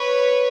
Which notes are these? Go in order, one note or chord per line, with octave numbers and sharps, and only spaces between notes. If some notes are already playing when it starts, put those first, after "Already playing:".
Already playing: B4 C#5